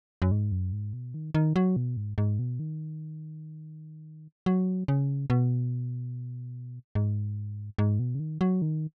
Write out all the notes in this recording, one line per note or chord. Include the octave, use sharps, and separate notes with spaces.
F#2
G#2
F#2
G#2
B2
D#3
D#3
F#3
B2
G#2
G#2
B2
D#3
F#3
C#3
B2
G#2
G#2
B2
C#3
D#3
F#3
D#3